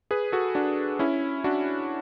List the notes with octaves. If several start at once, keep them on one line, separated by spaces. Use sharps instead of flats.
G#4 B4
F#4 A4
D4 F#4
C#4 E4
D4 F#4